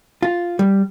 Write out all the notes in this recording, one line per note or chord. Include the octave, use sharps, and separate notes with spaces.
F4
G3